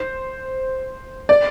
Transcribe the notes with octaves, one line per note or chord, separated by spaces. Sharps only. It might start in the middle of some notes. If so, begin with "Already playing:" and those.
Already playing: C5
D5